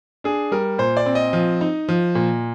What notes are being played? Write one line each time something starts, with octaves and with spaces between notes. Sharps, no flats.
D4 G#4
G3 A#4
A#2 C5
D5
C4
D#5
F3
D#4
F3
A#2